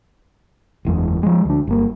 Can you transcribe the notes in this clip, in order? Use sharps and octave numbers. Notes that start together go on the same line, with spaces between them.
F#1 E2 G#3
F3 G#3
D2 D4
G1 A#3